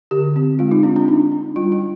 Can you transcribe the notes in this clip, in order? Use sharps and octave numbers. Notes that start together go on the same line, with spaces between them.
D3 G4
C4
G#3 F4
D#4
C4 D4
D4
D4 D#4
D4
G3 F4
F4